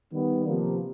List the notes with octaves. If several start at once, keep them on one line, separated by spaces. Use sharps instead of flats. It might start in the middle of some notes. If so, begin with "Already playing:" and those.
D#3 G3 B3
C3 F3 A#3